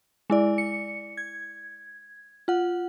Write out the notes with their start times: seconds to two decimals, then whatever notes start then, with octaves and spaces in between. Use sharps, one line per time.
0.30 G#3 E4 D5
0.58 C#7
1.17 G#6
2.48 F4 F#5